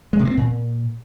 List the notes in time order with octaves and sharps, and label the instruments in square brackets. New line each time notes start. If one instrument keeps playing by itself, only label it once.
[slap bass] G#3
C3
A#3
C4
A#2